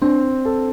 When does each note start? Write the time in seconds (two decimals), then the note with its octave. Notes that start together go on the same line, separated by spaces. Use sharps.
0.02 C4 D4
0.45 A4